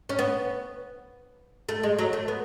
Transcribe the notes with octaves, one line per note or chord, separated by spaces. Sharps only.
C#4
B3
A3
G#3
F#3
A3
B3